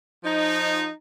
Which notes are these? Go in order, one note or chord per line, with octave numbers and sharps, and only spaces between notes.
F3 D#4